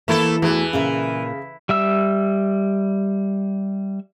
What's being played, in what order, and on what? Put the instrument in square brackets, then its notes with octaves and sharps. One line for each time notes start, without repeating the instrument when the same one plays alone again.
[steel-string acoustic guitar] E3 A#3 [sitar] A3 E4 A4
[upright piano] E2 [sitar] E3 [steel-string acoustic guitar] A3 F#4
[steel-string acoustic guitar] A#2 A#4 E5 [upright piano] C#3
[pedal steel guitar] G3 E5 E6